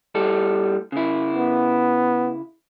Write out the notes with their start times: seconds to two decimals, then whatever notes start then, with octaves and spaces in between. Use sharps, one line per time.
0.15 A2 G3 A4
0.92 C#3 E4
1.34 B3